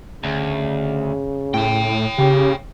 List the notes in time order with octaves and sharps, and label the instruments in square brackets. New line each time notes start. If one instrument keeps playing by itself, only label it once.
[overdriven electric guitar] D2 [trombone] C#3
[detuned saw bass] A2 [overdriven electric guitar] C#5 G5
[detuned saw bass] C#3 [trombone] G4